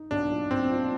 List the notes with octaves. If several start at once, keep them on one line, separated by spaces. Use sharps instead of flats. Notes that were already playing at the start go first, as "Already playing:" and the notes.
Already playing: D#4
B1 D4
A#2
B1 C4
A#2